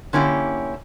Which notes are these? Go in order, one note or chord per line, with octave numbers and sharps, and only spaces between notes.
D3 A#3 C#4 E4 G4